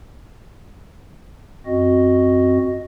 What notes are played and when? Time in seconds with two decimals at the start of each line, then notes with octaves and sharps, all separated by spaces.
1.66 F#2 C4 F#4 D#5